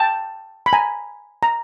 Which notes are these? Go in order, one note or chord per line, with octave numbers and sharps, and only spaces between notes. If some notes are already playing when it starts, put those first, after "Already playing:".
Already playing: G5 A5
B5
G#5 A#5
A#5